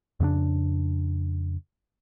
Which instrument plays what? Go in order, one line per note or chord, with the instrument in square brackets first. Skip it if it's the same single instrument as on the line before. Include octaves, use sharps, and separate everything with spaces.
[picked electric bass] F2 C#3 B3 D4